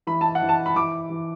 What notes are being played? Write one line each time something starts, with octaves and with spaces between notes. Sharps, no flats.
E3 B5
A5
F#5
E3
A5
B5
E3 D6
E3